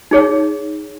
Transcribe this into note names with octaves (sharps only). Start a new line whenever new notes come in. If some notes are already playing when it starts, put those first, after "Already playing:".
D#4 G#4 C#5